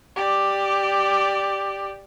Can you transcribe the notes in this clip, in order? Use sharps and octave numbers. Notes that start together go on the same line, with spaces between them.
G4 D5